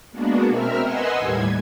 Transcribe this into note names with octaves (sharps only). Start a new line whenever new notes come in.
G#3 A#3 B3 D4 F#4
B2 C4 A#4 E5 F6
B4 D#5 F#5 G#5 C6 E6
D#2 A2 G3 G#6